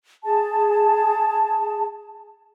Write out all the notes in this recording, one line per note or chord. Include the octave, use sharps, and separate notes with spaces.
G#4 A5